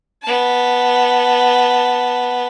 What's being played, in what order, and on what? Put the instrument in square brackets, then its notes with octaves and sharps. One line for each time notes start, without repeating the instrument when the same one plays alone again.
[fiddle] B3 A5